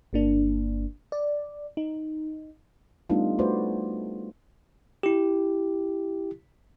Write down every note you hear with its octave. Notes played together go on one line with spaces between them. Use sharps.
G1 A#3 D4
D5
D#4
G3 A3 B3 D4 D#4 F4
A3 F#4 B4 C5 D5
E4 G4